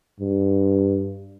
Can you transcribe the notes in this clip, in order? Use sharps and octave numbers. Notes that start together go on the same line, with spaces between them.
G2